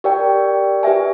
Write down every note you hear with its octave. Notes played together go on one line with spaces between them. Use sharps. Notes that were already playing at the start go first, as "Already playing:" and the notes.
G4 A#4 D5 G5
G4 B4 E5 G#5